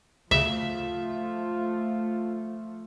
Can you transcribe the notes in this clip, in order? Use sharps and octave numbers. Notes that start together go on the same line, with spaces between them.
D2 C#3 F3 A3 F4 E5